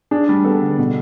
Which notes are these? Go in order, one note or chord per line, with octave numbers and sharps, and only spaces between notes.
D4 G#4
G3
B3 A4
D3
B2